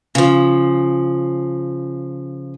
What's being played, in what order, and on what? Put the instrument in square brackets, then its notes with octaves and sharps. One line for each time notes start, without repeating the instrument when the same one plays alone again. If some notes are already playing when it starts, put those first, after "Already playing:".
[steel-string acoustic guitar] C#3 F3